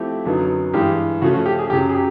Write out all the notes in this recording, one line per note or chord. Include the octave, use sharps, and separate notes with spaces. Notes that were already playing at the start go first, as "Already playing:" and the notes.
Already playing: F3 A3 C4 E4 G4
F#2 D3 F#3 B3 D#4
G2 E3 G#3 G4
C#3 F3 A3 C#4 F#4
F#4
G4
G#4
F#2 C#3 F#3 G4
G#4
G4